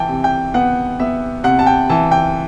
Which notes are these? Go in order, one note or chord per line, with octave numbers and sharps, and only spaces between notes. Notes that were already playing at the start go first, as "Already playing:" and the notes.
Already playing: E3 G5 A5
C3
G5
B3 F#5
B3 E5
C3 F#5
A5
G5
E3 A5
G5